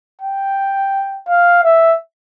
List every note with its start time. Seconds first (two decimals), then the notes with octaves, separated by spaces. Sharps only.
0.22 G5
1.28 F5
1.64 E5